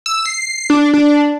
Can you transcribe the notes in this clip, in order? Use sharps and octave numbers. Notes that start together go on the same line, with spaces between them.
E6
C7
D4
D4